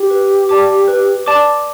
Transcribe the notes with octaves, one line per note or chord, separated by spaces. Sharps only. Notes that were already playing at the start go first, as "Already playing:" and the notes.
Already playing: G4
B4
D5 A5 D6
B4
D5 A5 D6